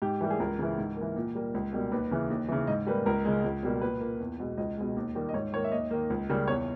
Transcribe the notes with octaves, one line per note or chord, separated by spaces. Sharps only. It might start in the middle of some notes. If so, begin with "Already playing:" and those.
G#2 G4
E3 G3 A#3
G#4
C#2 A#4
C#3 E3
G#2
E3 A#3
A#2
G3 A#3
C#2
B2 G3 A#3
D#2 B4
C#3 E3
D#2
C#3 E3
G#2 D#5
G3 A#3 B4
C#2 A#4
C#3 G#3
C#2
B2 G3 A#3
A#2 B4
A#3
E2
B2 G#3
C#2 D#5
B2 G#3
D#2
D#3 G3 A#3
D#5
G#2 C#5
D#3 A#3 C#5
E5
D#2 D#5
D#3 A#3
C#2
C#3 G3 A#3
E2 C#5